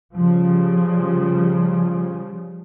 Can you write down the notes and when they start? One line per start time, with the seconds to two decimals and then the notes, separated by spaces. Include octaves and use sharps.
0.14 C#3 F3 G3